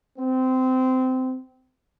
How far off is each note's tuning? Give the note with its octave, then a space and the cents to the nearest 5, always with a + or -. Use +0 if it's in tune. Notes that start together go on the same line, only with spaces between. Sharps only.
C4 -20